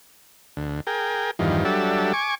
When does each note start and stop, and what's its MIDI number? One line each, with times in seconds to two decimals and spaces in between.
0.57 0.81 38
0.87 1.31 68
0.87 1.31 70
0.87 1.31 79
1.39 1.64 40
1.39 1.64 43
1.39 1.64 51
1.39 1.64 53
1.65 2.13 54
1.65 2.13 55
1.65 2.13 62
1.65 2.13 69
1.65 2.13 76
2.13 2.35 80
2.13 2.35 85
2.13 2.35 86